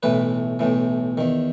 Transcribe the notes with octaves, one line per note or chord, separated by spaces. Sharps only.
B1 A2 E3 B4
B1 A2 E3
E2 D#3